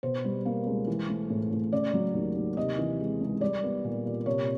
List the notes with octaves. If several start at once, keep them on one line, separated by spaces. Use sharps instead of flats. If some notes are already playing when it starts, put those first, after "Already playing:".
B2 C5
G3
A#3
C#2
E3
A3
A2
A2
C#3 D5
F#3
D#2
D#2
C3 D#5
E3
G#3
C#2
G3 D5
B3
A#2
A#2
C3 C#5